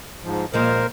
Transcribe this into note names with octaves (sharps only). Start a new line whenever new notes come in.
G#2 F3
A#2 F3 G#3 A#4 C5